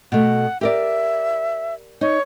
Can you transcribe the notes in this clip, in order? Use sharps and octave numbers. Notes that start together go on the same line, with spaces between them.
B2 A3 F#5
G4 A#4 D5 E5
D#4 C#5